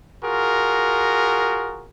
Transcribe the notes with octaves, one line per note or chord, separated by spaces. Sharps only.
F4 F#4 G#4 A#4